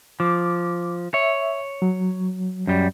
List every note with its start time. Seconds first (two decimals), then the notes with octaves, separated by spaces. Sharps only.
0.20 F3 D6
1.14 C#5 E5
1.82 F#3
2.67 F#2 G3